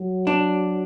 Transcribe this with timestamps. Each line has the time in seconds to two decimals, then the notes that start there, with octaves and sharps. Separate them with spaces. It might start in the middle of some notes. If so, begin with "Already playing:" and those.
Already playing: F#3
0.27 D4